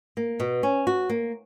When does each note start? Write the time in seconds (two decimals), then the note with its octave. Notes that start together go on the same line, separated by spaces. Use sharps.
0.17 A#3
0.40 B2
0.63 C#4
0.87 F#4
1.09 A#3